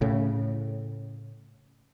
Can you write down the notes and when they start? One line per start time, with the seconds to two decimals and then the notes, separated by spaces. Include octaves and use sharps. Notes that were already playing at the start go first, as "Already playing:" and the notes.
0.01 A2 C#3